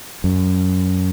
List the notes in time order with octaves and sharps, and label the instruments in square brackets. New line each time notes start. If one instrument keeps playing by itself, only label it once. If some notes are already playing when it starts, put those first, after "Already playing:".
[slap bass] F#2